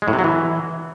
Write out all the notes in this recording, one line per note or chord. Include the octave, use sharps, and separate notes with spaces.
G#3
A2
C3
F#3
E3